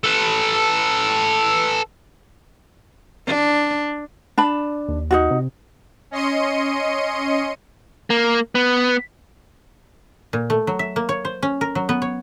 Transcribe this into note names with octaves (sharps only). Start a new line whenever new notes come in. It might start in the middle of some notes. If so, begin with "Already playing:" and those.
A4 B4
D4
D4 A5 B5
D#2
D#4 F4 F#4
C3
C#4 D#5 C6 C#7 D#7
A#3
B3
A#2
A3
F#3
E5
A#3
C#5
C5
C#4
A#4
F#3
B3
C#5